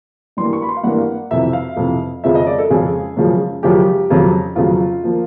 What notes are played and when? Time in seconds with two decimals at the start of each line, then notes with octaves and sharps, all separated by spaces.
0.37 G2 E3 G3 A#3 C6
0.53 C#6
0.62 B5
0.69 C6
0.77 F5
0.83 G2 E3 G3 A#3 F#5
1.31 F2 C3 E3 E5
1.53 F5
1.77 F2 C3 E3
2.24 F2 C#3 F3 G#3 E5
2.35 D#5
2.47 D5
2.58 A4
2.70 F2 C#3 F3 G#3 G#4
3.17 F#2 C#3 F3 G#3
3.63 F#2 C#3 F3 G#3 G4
4.10 F2 C#3 F#3
4.56 F2 C#3 F#3 F4
5.04 F3 A#3